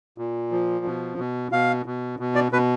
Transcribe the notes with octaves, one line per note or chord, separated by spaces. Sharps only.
A#2
F3
B2
B2
B2 F5
B2
B2
D5
B2 B4